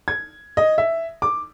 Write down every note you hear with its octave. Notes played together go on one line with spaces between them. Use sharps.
G#6
D#5
E5
D6